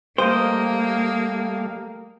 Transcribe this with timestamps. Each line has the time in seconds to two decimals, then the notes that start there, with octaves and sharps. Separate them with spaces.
0.18 G3 A3 A#3 A#4 C5 D#5 F5 G5